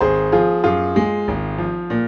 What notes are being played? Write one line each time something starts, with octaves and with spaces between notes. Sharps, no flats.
G#1 G#4 C5
F3 F4 G#4
F#2 F4 G#4
G#3
G#1
F3
A#2